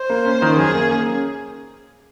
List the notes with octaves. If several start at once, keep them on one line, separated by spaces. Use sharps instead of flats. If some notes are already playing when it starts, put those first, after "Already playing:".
Already playing: C5
A#3
C#4
D#3
F#2 G#4
A#3
C#4